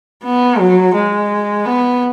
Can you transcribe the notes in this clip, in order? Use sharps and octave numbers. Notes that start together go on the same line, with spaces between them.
B3
F#3
G#3
B3